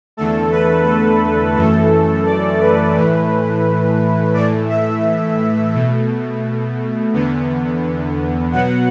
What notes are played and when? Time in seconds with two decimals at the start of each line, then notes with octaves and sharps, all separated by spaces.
0.17 E2 D3 A3 A4
0.52 B4
0.86 A4
1.56 F#2 E3 A3 A4
2.26 D5
2.60 B4
2.95 A2 E3 A3
4.34 A2 E3 A3 D5
4.70 E5
5.74 B2 A3
7.13 E2 D3 B3
8.52 B2 F#3 B3 F#5